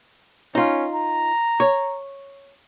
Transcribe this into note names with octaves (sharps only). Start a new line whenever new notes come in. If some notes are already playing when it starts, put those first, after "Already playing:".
C#4 D#4 F4
A#5
C#5